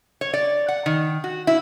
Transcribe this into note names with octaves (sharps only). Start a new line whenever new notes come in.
C#5
D5
F#5
D#3
F#4
E4